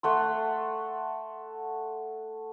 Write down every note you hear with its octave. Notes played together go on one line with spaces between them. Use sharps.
A3 F#5 C6